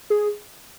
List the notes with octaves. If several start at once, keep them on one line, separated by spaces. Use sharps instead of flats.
G#4